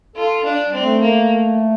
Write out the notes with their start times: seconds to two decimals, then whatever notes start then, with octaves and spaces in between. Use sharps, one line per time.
0.16 F4 A4
0.45 D4
0.66 G3
0.73 C4
0.79 A3
1.01 A#3